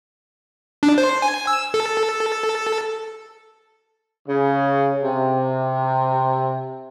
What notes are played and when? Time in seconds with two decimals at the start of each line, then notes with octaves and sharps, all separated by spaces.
0.83 D4
0.98 C5
1.22 G#5
1.47 E6
1.74 A4
4.28 C#3
5.02 C3